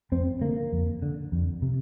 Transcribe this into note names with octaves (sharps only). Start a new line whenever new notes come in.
F2 C4
D3 A#3
F2
D3
F2
C3